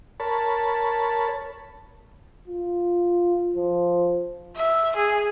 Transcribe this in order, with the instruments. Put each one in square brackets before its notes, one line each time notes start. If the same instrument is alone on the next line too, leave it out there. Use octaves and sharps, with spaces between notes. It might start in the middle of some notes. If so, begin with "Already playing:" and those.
[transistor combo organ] A#4 C#5 A5 B5
[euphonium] F4
F3
[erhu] E5
G#4